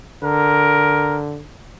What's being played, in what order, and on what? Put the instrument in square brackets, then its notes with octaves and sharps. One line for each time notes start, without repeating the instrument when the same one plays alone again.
[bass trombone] D3 [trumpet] A#4